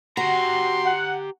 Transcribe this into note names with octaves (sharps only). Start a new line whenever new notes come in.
F#4 G4 A#5 C6
F#5